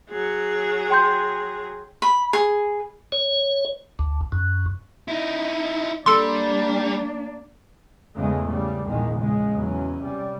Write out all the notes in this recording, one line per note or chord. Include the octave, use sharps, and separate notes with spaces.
F#3 G#4
G5 C6 G6
B5
G#4
C#5
D2
F#2
D#4 E4
G3 A#3 D4 A4 C6
E2 G#2 C#3 G#3 A3
C#3 G3
A#1 E2 D#3 G#3
C#3 G#3
E2 F#3 C#4
C3 G3